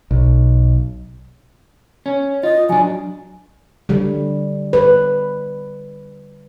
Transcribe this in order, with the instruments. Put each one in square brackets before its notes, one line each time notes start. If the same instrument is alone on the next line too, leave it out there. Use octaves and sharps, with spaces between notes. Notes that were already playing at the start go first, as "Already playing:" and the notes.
[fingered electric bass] B1
[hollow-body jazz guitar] C#4
[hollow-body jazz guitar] F4 [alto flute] D#5
[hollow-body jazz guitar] F#3 D4 [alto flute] G#5
[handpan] D3 G3
B4